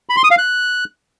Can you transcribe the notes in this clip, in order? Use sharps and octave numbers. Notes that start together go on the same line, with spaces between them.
B5
C6
D#6
F5
F#6